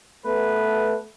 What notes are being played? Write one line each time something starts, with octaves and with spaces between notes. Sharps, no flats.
A3 B3 B4